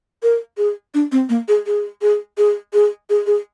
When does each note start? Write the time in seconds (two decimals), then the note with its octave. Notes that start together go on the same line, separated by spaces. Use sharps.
0.23 A#4
0.58 G#4
0.94 D4
1.12 C4
1.29 A#3
1.48 G#4
1.66 G#4
2.02 G#4
2.38 G#4
2.73 G#4
3.10 G#4
3.27 G#4